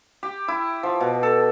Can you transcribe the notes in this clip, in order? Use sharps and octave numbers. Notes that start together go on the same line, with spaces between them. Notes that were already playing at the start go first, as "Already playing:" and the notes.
G4
E4
F3
B2
A4